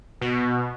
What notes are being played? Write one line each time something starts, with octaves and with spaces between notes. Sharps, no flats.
B2